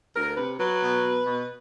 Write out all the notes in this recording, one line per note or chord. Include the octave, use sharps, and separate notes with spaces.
D2 A#4
C3 B4
F#3 B4
B2
B2
B2